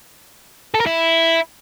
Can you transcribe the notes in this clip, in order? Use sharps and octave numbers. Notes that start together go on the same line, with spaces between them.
A4
A#4
E4